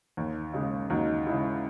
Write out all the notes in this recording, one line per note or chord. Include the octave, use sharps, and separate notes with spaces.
D#2
C#3 G#3
D#2 D#4 F#4
C#3 G#3 E4 G#4